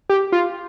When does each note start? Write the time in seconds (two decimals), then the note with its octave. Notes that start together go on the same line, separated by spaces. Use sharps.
0.10 G4
0.32 F4